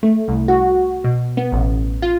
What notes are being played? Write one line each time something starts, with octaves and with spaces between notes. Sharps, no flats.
A3
C2
F#4
B2
B3
A1
F4